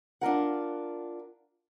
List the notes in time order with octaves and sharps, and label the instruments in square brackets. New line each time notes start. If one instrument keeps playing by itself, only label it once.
[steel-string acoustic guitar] D4 F4 A#4 F#5